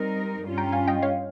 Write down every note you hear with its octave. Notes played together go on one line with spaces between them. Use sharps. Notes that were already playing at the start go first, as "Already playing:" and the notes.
Already playing: G3 C4 D#4 A#4
G2 G3 C#4 F4
G5 A#5
F5 G#5
D#5 G5
C#5 F5